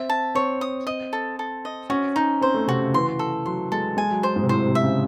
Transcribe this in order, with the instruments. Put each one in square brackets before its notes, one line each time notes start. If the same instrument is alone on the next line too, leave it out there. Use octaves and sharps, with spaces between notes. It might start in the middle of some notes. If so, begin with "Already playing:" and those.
Already playing: [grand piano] C4 [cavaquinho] E5
[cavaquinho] A5
[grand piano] C4 [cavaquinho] C#5
[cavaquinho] D#6
D#5
A4
A4
D#5
[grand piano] C#4 [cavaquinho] F#4
[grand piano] C#4 [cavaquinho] D#4
[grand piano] C4 [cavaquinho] C5
[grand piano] A3
[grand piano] C3 [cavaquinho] F#4
[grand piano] C#3
[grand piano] E3 [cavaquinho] C6
[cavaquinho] A4
[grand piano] F#3 [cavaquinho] C6
[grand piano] G#3 [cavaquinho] A4
[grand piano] G#3 [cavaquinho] G#5
[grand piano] F#3
[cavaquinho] C5
[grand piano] G#2
C3
[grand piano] A2 [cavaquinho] C5
[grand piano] C3
[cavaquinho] E5
[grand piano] C#3